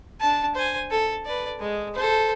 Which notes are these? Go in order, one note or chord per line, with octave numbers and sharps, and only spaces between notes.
D4 A5
C5 G#5
A4
B4 D5
G#3
A4 C5